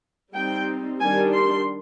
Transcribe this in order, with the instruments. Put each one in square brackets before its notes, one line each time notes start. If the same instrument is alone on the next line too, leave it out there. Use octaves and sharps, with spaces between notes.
[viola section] G3 C4 D#4 G5
D#3 G3 D4 G#5
C6